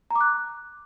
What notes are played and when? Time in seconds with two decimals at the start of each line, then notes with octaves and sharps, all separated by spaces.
0.11 A#5
0.16 D6
0.21 F#6